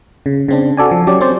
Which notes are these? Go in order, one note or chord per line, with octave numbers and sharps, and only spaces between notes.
C#3
C#3 C4 D4
F#4 A4 D5 G#5
F3
F#3 C#4 G4 D5
C4 C#4 C5 D5